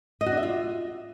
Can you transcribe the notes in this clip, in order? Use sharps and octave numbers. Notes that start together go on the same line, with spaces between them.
D#5
F#4
D4
E5
F4